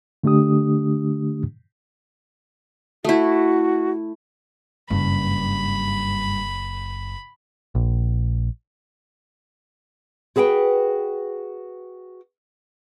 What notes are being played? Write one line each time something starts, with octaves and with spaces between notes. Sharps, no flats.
D3 A3 D4 G4 D#6
A3 E4 F#4
F#1 G2 B5
A#1
F#4 G#4 B4 F5 G5